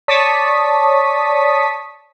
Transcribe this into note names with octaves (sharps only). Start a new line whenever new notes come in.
C#5 D5 A5 C#6 D#6 B6